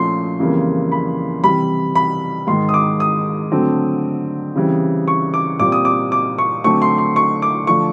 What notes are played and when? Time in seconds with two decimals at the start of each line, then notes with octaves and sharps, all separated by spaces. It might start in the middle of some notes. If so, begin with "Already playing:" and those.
Already playing: A#2 F3 A3 C#4 C6
0.40 F2 C#3 E3 G3 A#3
0.92 B5
1.44 C3 E3 G3 B5
1.95 B5
2.47 G#2 D#3 G#3 C6
2.69 D#6
2.74 D6
3.00 D#6
3.51 D3 F#3 A3 C4
4.56 C#3 E3 G3 C4
5.08 C#6
5.34 D6
5.59 A#2 G3 C4 D6
5.72 D#6
5.85 D6
6.12 D6
6.38 C#6
6.64 D3 F#3 A3 C4 C#6
6.82 C6
6.98 C6
7.16 C#6
7.42 D6
7.67 D3 F3 A3 D4 C#6